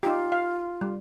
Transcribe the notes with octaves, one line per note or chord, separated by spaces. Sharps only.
D#4 F4 G4
F5
G3